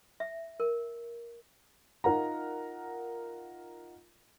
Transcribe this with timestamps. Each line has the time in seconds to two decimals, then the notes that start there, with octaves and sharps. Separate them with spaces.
0.20 E5
0.60 A#4
2.04 D#4 F4 A#4 F#5 A#5